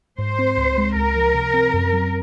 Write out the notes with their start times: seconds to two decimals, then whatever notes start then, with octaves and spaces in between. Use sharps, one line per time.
0.18 G#2 C5
0.39 C4
0.57 C#2
0.78 G#3
0.96 C#2 A#4
1.16 F3
1.34 C3
1.54 C4
1.73 F#2
1.93 F#3